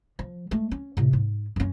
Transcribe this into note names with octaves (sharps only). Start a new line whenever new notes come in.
F3
G#3 A3
C#4
A2 C3
G#2
F#2 C#4